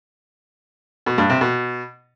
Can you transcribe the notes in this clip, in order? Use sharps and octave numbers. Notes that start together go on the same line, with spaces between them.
B2
G2
C3
B2